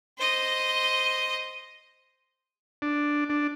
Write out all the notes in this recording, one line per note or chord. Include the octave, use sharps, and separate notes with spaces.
C5 D#5
D4
D4